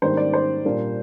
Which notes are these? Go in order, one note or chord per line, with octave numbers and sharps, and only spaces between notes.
G#2 D#3 G3 A#3 D4 C5
D5
C5
A#2 G3 A#3 D4